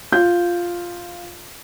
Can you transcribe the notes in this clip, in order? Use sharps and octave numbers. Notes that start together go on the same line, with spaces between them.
F4 G6